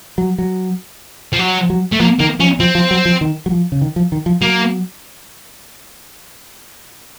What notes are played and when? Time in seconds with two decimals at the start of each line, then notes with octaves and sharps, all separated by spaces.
0.18 F#3
0.38 F#3
1.33 F3
1.39 F#3
1.70 F#3
1.92 A3
2.00 F3 A#3
2.20 D#3 A#3
2.40 F3 C#4
2.60 F3 C4
2.75 F3
2.91 F#3
3.05 F3
3.21 D#3
3.46 F#3
3.52 F3
3.72 C#3
3.81 D#3
3.96 F3
4.12 D#3
4.26 F3
4.41 F#3 A#3